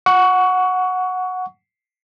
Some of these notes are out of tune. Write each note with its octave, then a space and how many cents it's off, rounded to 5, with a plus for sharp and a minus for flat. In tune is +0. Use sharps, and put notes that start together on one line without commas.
F#5 -10 C#6 +20